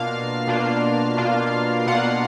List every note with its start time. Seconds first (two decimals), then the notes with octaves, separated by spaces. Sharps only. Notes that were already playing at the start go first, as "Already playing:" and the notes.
Already playing: B2 A#3 D4 F4 F5
0.47 B2 A#3 D4 F4
1.17 B2 A#3 D4 F4
1.86 B2 A#3 D4 F4 F#5